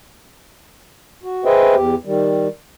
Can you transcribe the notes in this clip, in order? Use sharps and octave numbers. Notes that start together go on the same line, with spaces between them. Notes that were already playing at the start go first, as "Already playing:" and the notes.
F#4
G#4 B4 C5 D#5 E5 G5
E2 G4
D#3 G3